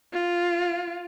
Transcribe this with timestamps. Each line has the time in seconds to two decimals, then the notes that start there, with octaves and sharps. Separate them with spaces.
0.13 F4